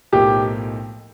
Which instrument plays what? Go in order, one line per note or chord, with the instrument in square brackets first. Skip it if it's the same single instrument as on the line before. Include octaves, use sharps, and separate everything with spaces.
[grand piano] B1 A2 F3 A#3 D#4 [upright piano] G4